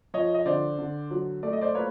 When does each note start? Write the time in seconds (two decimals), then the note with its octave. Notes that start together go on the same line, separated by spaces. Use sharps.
0.14 F3 C#5 D#5
0.34 D#5
0.46 D3 C5 D5
0.78 D3
1.11 F#3
1.43 A3 D5
1.53 D#5
1.61 C5 D5
1.74 A#3 B4 C#5